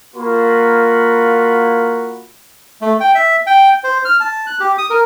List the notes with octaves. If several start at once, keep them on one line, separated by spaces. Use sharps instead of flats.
A#3 F4 F#4 B5
A3
G5
E5
G5
C5
F6
A5
F#6
G4
D#6
A#4